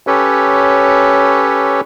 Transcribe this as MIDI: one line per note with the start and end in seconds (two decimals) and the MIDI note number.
0.07 1.81 61
0.07 1.81 67
0.07 1.81 69
0.07 1.81 71
0.07 1.81 73